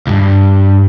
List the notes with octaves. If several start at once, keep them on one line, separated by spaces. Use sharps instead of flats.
C#2 G2